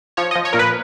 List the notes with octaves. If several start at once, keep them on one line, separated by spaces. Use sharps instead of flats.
F3 C#5
F3 D#5
C#5
A#2 A#4
B4